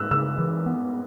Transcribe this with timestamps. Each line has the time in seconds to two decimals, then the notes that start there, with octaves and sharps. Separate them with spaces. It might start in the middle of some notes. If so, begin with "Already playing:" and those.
Already playing: E6 F#6
0.11 C#3 E6
0.38 E3
0.66 B3